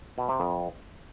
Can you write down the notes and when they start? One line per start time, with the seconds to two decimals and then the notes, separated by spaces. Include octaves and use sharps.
0.18 B2
0.29 C3
0.40 F2